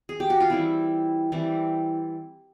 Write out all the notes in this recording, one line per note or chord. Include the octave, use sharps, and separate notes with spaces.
G#4
G4
F#4
F4
E3 G3 C4 E4
E3 G3 C4